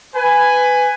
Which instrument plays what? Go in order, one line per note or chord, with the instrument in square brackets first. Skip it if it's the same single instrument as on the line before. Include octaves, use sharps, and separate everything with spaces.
[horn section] B4 G#5